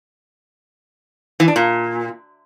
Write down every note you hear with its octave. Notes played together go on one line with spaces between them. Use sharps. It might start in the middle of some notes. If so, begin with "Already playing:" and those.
E3
D4
A#2